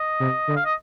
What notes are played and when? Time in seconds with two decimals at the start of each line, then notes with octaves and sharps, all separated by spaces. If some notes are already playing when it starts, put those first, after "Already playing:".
Already playing: D#5
0.20 C3
0.48 D3
0.56 F5
0.65 D#5